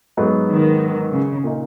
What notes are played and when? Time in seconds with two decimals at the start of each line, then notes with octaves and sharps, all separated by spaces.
0.17 G#2 F#3 B3 D#4
0.49 D#3
1.12 C#3
1.44 A#2 A#3 D#4